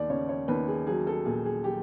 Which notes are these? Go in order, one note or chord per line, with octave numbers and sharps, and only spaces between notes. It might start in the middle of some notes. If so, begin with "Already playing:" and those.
Already playing: D#2 D5
C#3 C#5
C#5
D#2 B4
G#4
F#3 G#4
A4
A#2 G#4
G#4
G4